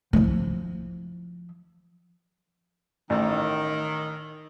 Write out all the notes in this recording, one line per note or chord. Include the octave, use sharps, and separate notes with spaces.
F3 E4
A1 D#3